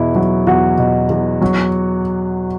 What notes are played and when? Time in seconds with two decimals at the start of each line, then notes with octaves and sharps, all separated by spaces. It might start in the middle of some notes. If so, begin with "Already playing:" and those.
Already playing: E2 B2 E4
0.15 F#3
0.47 E2 F#4
0.78 B2
1.10 E2
1.41 F#3